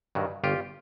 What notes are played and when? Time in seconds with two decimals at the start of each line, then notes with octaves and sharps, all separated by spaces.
0.15 G2 D#3 F#3
0.44 G1 F4 G4